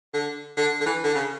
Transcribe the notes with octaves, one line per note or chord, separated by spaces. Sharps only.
D3
D3
D3
E3
D3
C#3